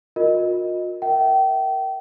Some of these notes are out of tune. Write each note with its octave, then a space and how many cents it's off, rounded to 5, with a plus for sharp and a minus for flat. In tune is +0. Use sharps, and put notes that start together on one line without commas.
F4 +45 A#4 +0 D#5 +0
A#4 -5 E5 +0 G5 -35